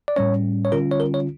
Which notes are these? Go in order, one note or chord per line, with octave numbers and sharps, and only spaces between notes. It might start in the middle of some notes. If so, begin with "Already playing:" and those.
D5
A2 G3 C#4 C#5
C#5
D3 G3 C#4 F4 A#4
C#5
A#4
C#5